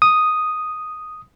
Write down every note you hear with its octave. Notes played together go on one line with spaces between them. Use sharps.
D#6